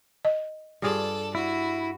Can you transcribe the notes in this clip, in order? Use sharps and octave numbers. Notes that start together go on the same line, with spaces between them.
D#5
G2 F4 G#4 A4 D5
E4 F#4